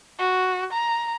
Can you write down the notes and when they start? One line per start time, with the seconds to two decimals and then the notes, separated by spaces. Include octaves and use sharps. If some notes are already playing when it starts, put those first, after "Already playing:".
0.19 F#4
0.73 A#5